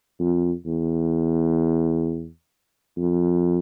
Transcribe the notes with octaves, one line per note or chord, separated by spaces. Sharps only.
F2
E2
F2